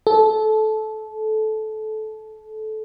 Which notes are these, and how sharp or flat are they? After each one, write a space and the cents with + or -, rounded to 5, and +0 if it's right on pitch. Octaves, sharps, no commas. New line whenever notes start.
A4 -20